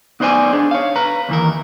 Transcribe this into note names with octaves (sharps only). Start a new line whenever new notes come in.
B3 D#4 B4 C5 D5 G#5
D4 G#4
C#5 F5
B4 A#5
D#2 E3 A#4